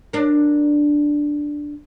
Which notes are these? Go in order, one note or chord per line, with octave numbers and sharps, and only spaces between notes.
D4 A#4